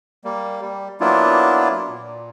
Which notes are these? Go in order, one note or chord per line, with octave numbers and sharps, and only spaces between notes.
G3 A#3
G3
F#3 A#3 B3 D4 E4 F4
A#2